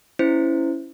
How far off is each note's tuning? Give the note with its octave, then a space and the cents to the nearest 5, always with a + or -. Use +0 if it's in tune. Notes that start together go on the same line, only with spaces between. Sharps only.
C#4 +0 E4 +0 C5 -20